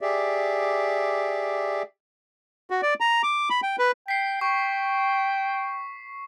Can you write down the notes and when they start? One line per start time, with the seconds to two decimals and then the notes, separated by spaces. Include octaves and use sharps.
0.01 G4 G#4 D5 E5
2.70 F#4
2.82 D5
3.00 A#5
3.23 D6
3.50 B5
3.63 G5
3.79 B4
4.08 G5 B6 C7
4.41 G5 C#6